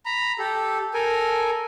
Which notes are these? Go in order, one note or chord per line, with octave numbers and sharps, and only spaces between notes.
A#5 B5
G4 A4
A4 A#4 G#5